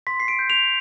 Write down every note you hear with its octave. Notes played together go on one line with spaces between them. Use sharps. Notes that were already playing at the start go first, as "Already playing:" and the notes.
C6 B6
C7
D7
G6
F7